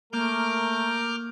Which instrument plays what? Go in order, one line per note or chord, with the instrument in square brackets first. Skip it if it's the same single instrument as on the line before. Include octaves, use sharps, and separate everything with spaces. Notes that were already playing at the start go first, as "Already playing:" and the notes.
[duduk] A3 [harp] A#3 [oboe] A#4 [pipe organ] D6 F6 G6